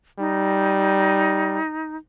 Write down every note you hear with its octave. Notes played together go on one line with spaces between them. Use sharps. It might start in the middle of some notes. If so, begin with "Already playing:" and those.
G3 D#4